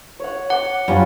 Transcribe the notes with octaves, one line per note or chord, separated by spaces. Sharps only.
C#5 F#5
F#5 D6
F#2 G3 C#4 F4